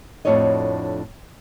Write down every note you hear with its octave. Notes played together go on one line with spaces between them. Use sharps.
F2 A2 D4 F#4 C#5 D#5